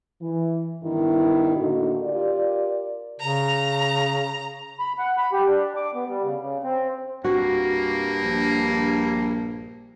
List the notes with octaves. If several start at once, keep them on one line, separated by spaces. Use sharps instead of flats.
E3
G2 D#3 B3 E4
A2 D3 A3 A#3 D#4 F#4
F4 G4 A#4 D5
C#3 A#5
B5
F#5
B5
G4
D4
D6
B3
G3
C#3
C#3
C4
C2 G2 A#3 F#4
A#1